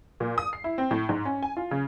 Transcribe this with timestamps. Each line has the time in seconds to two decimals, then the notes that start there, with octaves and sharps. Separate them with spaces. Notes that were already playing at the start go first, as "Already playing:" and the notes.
0.20 A#2
0.38 D#6
0.53 C7
0.64 E4
0.78 C4
0.91 A2
1.09 G#2
1.25 C#4
1.43 G#5
1.57 F4
1.71 C#3